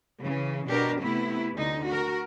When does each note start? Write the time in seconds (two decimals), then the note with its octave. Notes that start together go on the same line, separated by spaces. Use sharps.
0.21 C#3 E3
0.68 B2 D4 G4 A#4
1.01 C3 A3 B3 E4
1.54 D2 D3 D#4
1.87 F#4 A#4